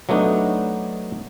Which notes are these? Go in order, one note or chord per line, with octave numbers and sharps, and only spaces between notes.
F#3 A3 B3 D4 D#4